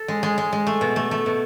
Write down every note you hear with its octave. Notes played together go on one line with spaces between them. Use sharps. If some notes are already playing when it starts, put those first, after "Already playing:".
Already playing: A4
G#3
G#3
G#3
G#3
A3
B2
A3
A3
B2